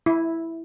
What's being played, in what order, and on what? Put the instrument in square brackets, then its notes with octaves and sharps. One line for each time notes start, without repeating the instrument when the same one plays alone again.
[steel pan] E4